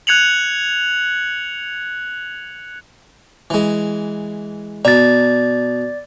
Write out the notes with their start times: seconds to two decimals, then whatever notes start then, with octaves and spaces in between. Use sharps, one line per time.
0.07 F#6 G#6 C#7 F7 F#7
3.50 E3 G#3
4.85 B2 D5 A#5 A6